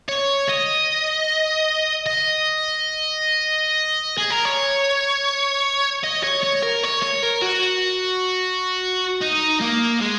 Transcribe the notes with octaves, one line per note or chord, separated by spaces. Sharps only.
C#5
D#5
D#5
G#4
A#4
C#5
D#5
C#5
C#5
A#4
C#5
C#5
A#4
F#4
D#4
A#3
G#3